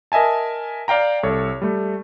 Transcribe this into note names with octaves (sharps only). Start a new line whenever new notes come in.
A#4 D#5 E5 G#5 A5
D5 F5 G5 A#5
C2 A4 C#5
G3 A3